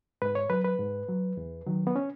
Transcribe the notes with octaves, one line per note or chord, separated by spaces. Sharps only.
G#2 B4
C#5
F#3 B4
B4
G#2
F#3
E2
D#3 F#3
B3
C#4